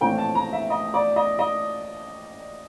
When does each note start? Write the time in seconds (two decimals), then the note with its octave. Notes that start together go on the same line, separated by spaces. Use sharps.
0.01 A#1 A2 E3 A3 C4 G5
0.18 A5
0.35 A#5
0.53 E5
0.70 D#5
0.94 D5
1.16 D#5
1.39 D#5